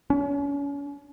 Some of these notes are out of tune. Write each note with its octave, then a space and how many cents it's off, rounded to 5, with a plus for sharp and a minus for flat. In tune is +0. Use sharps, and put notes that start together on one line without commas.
C#4 +35